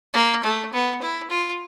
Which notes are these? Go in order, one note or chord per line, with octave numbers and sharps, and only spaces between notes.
A#3
A3
B3
E4
F4